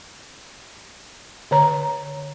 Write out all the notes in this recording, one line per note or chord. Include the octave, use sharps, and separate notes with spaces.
D3 C#5 A#5